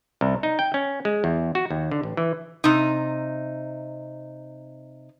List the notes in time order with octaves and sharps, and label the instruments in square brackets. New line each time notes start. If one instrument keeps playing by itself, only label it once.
[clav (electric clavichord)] C2
D#4
G5
C#4
G#3
E2
F#4
D#2
D3
A1
E3
[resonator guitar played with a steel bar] C3 D#4